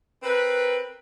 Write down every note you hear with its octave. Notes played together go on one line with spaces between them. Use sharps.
C4 A#4 B4